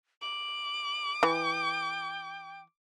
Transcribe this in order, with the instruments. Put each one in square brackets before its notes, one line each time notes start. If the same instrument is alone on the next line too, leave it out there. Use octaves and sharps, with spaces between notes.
[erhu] D6 [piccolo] F#7
[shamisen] E3 [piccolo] G5